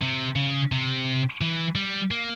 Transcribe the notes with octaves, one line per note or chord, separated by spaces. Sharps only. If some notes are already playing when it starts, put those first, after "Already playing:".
C3
C#3
C3
E3
G3
A#3